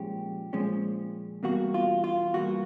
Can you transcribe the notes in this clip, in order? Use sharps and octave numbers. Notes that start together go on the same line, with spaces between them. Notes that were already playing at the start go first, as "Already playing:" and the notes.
Already playing: A#2 F3 G#3 C#4 G4
A#2 F3 G#3 C#4
E2 B2 G3 A#3 F#4
F4
F4
E2 B2 G3 A#3 F#4